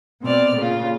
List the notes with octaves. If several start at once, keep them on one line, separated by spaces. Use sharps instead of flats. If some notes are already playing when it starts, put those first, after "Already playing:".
B2 C4 D5 F6
A#2 C#3 F4